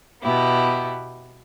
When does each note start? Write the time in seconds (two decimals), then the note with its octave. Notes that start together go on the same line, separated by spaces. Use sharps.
0.23 B2 B3 E4 G4